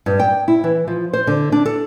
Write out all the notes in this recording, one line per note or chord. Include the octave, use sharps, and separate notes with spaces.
G2
G5
E4
E3
F3
C5
D3
D4
A4